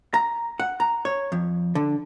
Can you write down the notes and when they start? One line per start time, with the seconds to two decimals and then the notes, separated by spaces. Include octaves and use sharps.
0.14 A#5
0.60 F#5
0.80 A#5
1.05 C#5
1.32 F2
1.75 D3